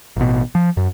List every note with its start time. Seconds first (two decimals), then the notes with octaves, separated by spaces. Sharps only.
0.16 A1 B2
0.55 F3
0.77 F#2